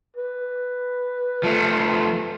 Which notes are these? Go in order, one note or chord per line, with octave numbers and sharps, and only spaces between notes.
B4
F3 A3